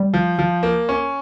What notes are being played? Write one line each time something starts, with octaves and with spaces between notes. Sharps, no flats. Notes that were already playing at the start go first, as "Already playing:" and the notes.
Already playing: G3
F3
F3
A#3
C#4